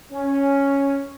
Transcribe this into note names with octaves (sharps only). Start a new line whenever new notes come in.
C#4